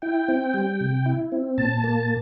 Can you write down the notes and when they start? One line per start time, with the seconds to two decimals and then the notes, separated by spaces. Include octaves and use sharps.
0.02 E4 G5
0.28 C4
0.54 G3
0.81 C3
1.06 E4
1.32 C4
1.58 A#2 A5
1.84 A#3